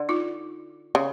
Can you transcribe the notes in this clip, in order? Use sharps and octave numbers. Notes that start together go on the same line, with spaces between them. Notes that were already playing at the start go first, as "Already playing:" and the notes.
Already playing: D3
D#4 F4
C#3